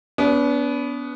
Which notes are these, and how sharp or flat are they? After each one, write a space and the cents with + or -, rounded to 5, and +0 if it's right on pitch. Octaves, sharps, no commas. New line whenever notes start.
B3 +0 D4 -45